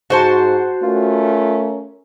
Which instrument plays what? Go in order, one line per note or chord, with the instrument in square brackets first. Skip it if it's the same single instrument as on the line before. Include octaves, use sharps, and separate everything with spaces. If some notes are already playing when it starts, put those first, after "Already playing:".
[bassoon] G#2 [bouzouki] F#4 C5 A5
[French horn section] A3 C#4 A#4 [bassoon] F4